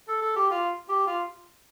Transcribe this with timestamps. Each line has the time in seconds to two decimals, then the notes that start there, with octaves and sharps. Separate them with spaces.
0.08 A4
0.22 A4
0.36 G4
0.51 F4
0.89 G4
1.07 F4